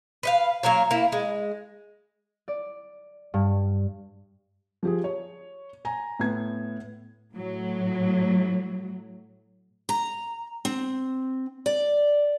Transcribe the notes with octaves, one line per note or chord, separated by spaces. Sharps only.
B4 D#5 F5
F#3 A#3 A#4 C#5
A#3 E4
G#3
D5
G2
F3 G4 G#4
C#5
G#5 A#5
A2 B3 G#6
A2 F#3
A#5
C4
D5